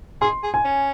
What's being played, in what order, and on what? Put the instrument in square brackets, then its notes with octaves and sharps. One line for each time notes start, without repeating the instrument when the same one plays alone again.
[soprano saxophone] G#4 [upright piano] C6
[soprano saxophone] G#4
[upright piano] G#5
[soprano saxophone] C#4